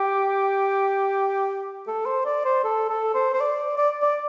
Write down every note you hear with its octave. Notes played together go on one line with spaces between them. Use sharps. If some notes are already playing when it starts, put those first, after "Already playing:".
Already playing: G4
A4
C5
D5
C5
A4
A4
C5
C5
D5
D5
D5